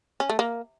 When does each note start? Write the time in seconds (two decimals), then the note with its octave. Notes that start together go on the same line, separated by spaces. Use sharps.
0.20 C#4
0.30 A3
0.39 A#3